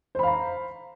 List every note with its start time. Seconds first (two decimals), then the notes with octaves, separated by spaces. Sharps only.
0.15 C5
0.19 B5
0.23 F5
0.27 A#5